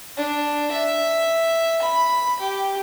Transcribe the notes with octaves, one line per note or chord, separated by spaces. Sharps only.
D4
E5
B5
G4